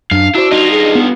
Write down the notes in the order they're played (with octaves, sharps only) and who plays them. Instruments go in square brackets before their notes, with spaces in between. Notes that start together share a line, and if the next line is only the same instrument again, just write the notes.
[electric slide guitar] F#2 [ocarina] D4 [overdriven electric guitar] F5
[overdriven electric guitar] D4 [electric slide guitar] E4 C5 [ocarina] F#4 [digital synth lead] E6
[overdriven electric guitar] G2 F4 [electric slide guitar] D4 D#4 [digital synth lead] D#5
[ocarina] G#4
[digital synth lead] B3